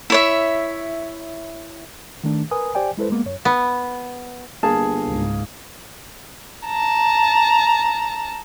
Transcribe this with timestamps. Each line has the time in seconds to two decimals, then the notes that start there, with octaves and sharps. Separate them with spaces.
0.10 E4 C#5 E5
2.24 D#3 A3 D4
2.51 A#4 B4 G#5 D#6
2.75 G4 C5 D5 G5 G#5
2.97 G#3 E4 A4 B4 C5
3.10 G#3 A#3 B3
3.25 F#2 C#5
3.45 B3
4.63 G1 A#3 G#4 A5
5.06 C#2 G#2
6.67 A5 A#5